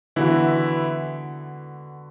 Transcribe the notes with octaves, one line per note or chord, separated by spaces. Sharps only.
D3 E3 B3 E4 F#4 B4